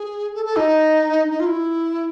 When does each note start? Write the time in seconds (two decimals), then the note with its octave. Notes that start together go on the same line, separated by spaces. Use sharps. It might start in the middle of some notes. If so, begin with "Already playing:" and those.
Already playing: G#4
0.35 A4
0.45 A4
0.56 D#4
1.30 D#4
1.40 F4
1.46 E4